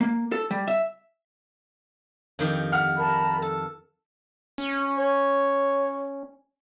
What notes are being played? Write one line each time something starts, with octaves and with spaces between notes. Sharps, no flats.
A#3
A4
G3
E5
F2 D#3 G4
F#5 F6
A#4 A5 B5
A4 A5
C#4
C#5